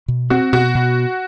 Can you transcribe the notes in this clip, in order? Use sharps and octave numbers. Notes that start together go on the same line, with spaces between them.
B2
C4 F#4
B2 F#4
B2